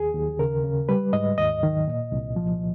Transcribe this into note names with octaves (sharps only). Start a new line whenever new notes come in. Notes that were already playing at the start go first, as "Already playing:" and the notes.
Already playing: D#2 G#4
D#2
C#3 A#4
C#3
G3 B4
G#2 D#5
D#2 D#5
D#3
A#2
C2
F3